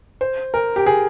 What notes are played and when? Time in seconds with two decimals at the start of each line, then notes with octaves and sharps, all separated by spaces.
0.21 C5
0.54 A#4
0.76 G4
0.86 G#4